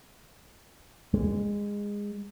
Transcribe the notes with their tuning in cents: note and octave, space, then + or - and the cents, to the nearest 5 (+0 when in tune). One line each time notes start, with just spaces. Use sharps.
G#3 -20